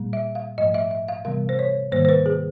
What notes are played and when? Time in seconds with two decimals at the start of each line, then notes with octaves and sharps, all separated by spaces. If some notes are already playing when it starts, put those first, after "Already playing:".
Already playing: A#2 G3 A#3
0.13 E5
0.35 F5
0.58 G#2 F3 A3 D#5
0.74 E5
0.91 E5
1.08 F5
1.25 C3 E3 G3 B3 F5
1.49 C5
1.59 C#5
1.92 G#2 D#3 G3 A#3 C5
2.05 C5
2.09 B4
2.26 G#4